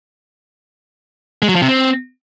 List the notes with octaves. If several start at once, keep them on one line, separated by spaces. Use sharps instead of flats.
G#3
F#3
F3
C3
C4